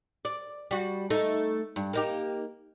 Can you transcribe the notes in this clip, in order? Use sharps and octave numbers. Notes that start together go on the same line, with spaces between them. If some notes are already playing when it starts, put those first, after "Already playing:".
D5
G3 F#4
A3 D#4
G2
A#3 D#4 G4